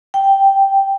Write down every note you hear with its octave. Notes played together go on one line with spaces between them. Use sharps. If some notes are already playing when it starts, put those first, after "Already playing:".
G5